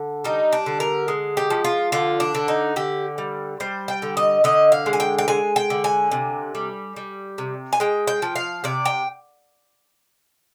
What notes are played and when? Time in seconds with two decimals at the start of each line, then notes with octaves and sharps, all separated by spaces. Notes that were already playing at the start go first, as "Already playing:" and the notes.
Already playing: D3
0.24 G3 D#4
0.52 D4
0.66 D3
0.80 A#4
1.08 G#3
1.37 G4
1.50 F3
1.64 F4
1.92 D3 F4
2.20 D4
2.35 D3
2.48 D#4
2.76 D3 G4
3.18 G3
3.60 G3 C5
3.88 G5
4.02 D3
4.17 D#5
4.44 D3 D#5
4.72 F5
4.86 G#3
4.93 G#5
5.00 G5
5.18 G5
5.28 G#3 G#5
5.56 G5
5.70 D3
5.84 G#5
6.11 C3
6.55 G3
6.96 G3
7.38 C3
7.73 G#5
7.80 G#3 G5
8.07 G5
8.22 F3
8.36 F5
8.64 C3 D5
8.85 G5